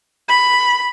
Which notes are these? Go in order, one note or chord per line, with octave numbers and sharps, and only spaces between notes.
B5